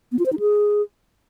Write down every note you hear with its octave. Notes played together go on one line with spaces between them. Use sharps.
B3
F4
C5
D#4
G#4